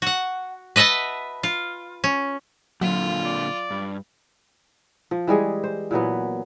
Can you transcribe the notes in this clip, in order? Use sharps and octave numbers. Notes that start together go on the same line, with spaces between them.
F#4 F#5
B4 D#5 E5 F#5 A5
F4
C#4
A#2 D3 F#3 F4
D5
G2
F3
E3 G3 G#3 G#4
C5
A#2 E3 F#3 B3